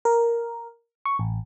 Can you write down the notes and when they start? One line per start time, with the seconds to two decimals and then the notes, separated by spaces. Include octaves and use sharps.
0.05 A#4
1.06 C#6
1.19 A1